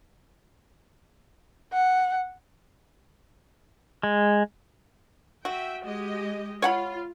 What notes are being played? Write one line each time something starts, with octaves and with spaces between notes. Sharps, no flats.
F#5
G#3
F#4 E5 G5
G#3 G4 D#5
F4 C#5 F#5 B5